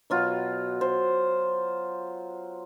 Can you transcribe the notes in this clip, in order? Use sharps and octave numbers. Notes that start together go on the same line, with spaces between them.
B2 F#3 F4
C5